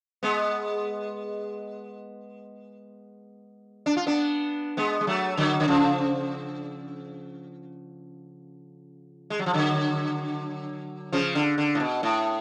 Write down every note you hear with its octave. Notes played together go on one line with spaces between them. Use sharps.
G#3 B3
D4
F4
B3 D4
G#3 B3
G#3
F#3 A3
D3 F#3
D3
C#3 F3
G#3
F#3
F3
D3 F#3
C#3 F3
D3
D3
A2
B2
A2